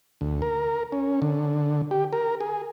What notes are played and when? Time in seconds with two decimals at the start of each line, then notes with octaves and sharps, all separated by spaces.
0.21 D2
0.42 A#4
0.92 C#4
1.22 D3
1.91 G4
2.13 A#4
2.40 G#4